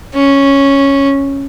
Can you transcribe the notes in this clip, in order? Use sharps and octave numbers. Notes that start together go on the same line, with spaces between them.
C#4